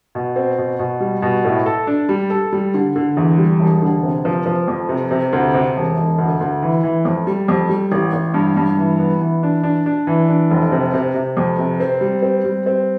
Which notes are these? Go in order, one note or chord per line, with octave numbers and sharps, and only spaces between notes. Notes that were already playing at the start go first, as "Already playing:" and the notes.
B2
C4
B2
B2
G3
B2
A2
A4
D4
G3
A4
G3
D3
D3
E2
G3
E1
D3
C3
F3
F3
F2
C3
C3
D2
C3
E1
E1
D2
D2
E3
E3
F2
G3
F2
G3
A1
A1
G2
G2
E3
B3
E3
D4
D4
D4
E3
D4
F1
C3
C3
C3
F2
C3
C4
G3
C4
G3
C4